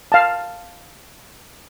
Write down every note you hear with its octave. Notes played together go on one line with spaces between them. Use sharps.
F5 A5